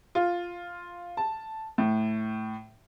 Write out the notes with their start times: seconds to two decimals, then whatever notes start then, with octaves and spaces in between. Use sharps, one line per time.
0.15 F4
1.17 A5
1.78 A2